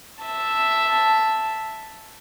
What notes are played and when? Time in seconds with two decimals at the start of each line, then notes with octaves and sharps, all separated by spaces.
0.22 E5 A5